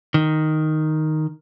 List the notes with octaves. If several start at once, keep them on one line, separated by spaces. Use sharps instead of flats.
D#3